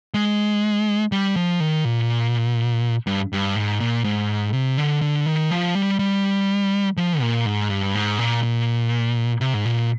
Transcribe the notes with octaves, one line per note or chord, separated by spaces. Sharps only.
G#3
G3
F3
D#3
A#2
G2
G2
G#2
A#2
G#2
C3
D3
D3
D#3
F3
G3
G3
F3
A#2
G#2
G2
G#2
A#2
A#2
C3
G#2
A#2